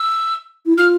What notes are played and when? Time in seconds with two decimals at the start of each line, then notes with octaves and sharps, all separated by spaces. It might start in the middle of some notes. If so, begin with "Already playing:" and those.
Already playing: E6
0.66 E4
0.77 F4 F6